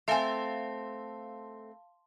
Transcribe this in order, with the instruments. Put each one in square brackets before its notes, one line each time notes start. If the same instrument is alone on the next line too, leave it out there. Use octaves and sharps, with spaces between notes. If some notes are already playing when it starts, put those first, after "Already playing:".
[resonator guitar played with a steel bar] A3 C4 [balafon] E5 G#5 [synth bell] F5 A5 C6